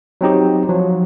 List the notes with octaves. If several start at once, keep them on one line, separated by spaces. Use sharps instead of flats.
F#3 C4 D#4 G4
F3 F#3